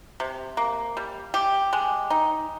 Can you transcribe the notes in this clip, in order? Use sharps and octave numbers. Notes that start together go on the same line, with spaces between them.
C3
A#3
G3
G4
G#3
D#4